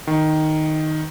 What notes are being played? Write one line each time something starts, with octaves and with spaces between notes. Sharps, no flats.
D#3